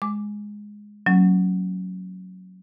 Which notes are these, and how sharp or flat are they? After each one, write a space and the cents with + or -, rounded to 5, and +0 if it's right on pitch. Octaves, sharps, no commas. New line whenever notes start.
G#3 +0 D6 +0
F#3 +0 A#3 -25 C#4 +0